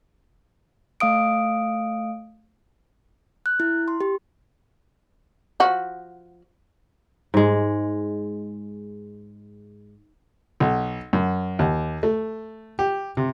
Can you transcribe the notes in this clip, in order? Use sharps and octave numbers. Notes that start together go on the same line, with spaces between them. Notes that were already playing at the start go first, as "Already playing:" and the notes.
A3 F5 D#6 D7
F#6
E4
C6
G4
F3 F#4
G#2 G#3
B1
F#2
D#2
A3
G4
C3